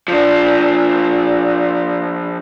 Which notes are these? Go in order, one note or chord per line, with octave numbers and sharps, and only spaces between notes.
F3 D4